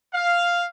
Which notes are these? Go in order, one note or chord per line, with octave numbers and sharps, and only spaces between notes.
F5